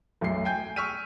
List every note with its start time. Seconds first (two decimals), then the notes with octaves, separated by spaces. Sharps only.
0.21 B1 F#2 A3 C7
0.45 G5 G#5 G6
0.76 C#6 E6 F6 B6 D#7